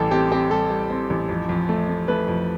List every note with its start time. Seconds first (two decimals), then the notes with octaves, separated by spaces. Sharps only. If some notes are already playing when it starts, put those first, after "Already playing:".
Already playing: A1 G3 G4 A4
0.11 C4 G4
0.31 C4 G4
0.51 G3 A4
0.70 G3
0.90 C4
1.10 A1
1.29 F2
1.49 F2
1.69 A3
1.89 A3
2.08 A3 B4
2.28 F2